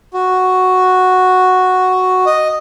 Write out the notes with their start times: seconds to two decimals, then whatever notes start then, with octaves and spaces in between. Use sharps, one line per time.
0.14 F#4
2.26 D#5